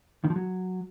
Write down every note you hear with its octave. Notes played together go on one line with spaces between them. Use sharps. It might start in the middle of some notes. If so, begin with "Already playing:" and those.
D#3
F3
F#3